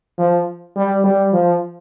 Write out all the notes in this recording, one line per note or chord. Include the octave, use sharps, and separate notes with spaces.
F3
G3
G3
F3